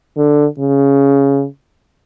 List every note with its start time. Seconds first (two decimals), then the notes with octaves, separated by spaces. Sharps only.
0.17 D3
0.59 C#3